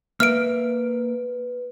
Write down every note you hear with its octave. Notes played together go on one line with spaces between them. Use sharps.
A#3 B4 E5 F6 D7